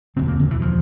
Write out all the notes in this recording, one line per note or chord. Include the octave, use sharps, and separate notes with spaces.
E1 D2 D3 C4
A#3
D3
E3
F3